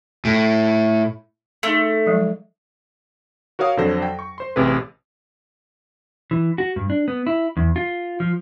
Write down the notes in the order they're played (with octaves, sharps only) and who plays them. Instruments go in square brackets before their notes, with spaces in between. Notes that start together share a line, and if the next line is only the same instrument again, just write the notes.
[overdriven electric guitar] A2
[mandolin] A3 [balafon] D#4 G#4
[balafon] F3 F#3 G#3
[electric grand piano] F#4 A#4 C#5 F5 D#6
F2 D3 F#3 C5 A#6
G5
C#6
C5 C6
A1 C3 G#4 B4
[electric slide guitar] E3
F#4
G2
D4
B3
E4
E2
F4
F3